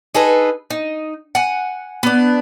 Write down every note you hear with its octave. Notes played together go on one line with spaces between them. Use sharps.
D#4 G#4 A4 B4
D#4
F#5 G#5
B3 D4